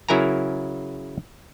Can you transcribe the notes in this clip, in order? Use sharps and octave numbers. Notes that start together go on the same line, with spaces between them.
C#3 F#3 E4 A#4 G#5 A#5